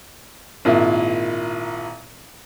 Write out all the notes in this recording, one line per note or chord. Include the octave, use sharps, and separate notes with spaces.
G#1 A#2 E4